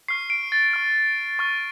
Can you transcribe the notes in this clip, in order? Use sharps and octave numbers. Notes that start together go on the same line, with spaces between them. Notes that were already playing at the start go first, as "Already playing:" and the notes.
C#6 F6 C7
D7
A6
C#6 F6
C#6 F6